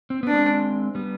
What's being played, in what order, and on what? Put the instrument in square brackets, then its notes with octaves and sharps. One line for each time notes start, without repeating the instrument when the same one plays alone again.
[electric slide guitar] C4
[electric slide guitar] B3 [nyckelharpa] D4
[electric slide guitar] G#3 C4
G3 B3